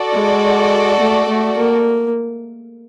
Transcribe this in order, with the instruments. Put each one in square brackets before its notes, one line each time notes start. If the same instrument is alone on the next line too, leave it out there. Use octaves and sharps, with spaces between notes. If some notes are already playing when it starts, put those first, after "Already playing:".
Already playing: [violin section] F#4 A4 D5
[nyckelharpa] G#3
A3
A3
A#3